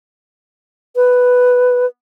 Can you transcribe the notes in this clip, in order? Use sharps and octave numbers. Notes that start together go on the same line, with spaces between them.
B4